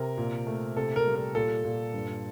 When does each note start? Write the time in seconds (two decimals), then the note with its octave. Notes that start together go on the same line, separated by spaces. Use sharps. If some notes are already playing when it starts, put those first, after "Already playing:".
Already playing: C3 A#4
0.18 A#2
0.47 A3
0.76 C3 A4
0.96 A#4
1.06 G3
1.15 A#4
1.35 A#2 A4
1.64 A#2
1.94 G2